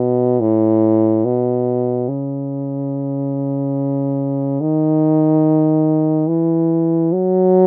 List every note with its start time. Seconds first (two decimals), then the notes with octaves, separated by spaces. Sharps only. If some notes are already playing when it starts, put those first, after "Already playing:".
Already playing: B2
0.40 A2
1.25 B2
2.08 C#3
4.61 D#3
6.27 E3
7.12 F#3